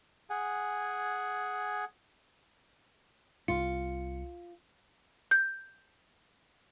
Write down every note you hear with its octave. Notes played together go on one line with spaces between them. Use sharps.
G#4 F#5 G#5
C2 F4 C#7
G6